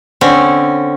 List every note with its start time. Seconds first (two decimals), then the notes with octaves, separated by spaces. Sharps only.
0.21 D3 C4 C#4